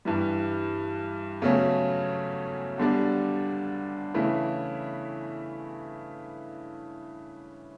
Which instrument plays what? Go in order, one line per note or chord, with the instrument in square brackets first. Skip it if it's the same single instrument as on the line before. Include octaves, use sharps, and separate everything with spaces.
[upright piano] G2 E3 G3
E2 C#3 F#3 A3 C#4
E2 D3 G3 D4
C#3 E3 A3 E4